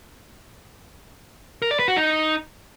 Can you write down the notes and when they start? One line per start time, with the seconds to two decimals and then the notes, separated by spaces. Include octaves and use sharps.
1.62 A#4
1.71 D5
1.79 B4
1.88 F#4
1.97 D#4